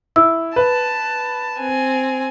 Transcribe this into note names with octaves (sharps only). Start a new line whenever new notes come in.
E4 E6
B4 A5
C4 G#5